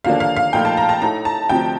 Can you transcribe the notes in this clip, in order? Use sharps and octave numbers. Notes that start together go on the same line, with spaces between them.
D#2 D3 F3 A#3 D4 F5
F5
F5
A#1 A#2 A3 D#4 G5
A5
A#5
A5
A2 A3 D#4 A#5
A5
D2 C3 F3 G5